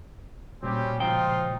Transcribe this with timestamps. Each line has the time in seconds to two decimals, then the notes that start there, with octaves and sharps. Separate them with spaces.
0.63 A#2 G3 C4 C#4 F#4 G4
1.00 C#2 F3 D#4 F4 C5 G5